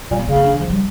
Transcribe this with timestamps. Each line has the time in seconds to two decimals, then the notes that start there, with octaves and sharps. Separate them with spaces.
0.11 A#2 G3
0.19 A#3
0.28 C#3 A3
0.36 A#3
0.44 D4
0.53 E3
0.61 F3
0.70 G3